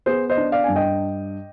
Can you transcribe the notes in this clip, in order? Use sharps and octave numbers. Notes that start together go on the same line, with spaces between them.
B3 G#4 C5
C5 D#5
D4
D5 F5
G2 G#5
D#5 G5